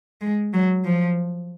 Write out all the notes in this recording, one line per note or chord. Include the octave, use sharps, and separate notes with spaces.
G#3
F#3
F3